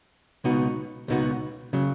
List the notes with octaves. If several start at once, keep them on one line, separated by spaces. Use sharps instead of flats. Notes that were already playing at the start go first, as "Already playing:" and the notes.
C#2 B2 B3 D#4 F#4
C#2 B2 B3 D#4 F#4
C#3 F#3